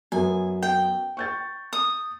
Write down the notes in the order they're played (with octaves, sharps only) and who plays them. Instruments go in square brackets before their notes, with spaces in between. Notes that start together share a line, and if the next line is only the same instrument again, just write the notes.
[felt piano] F#2 B3 [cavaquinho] G#5
[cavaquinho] G5
[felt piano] C#6 G6 A6
[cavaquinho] D#6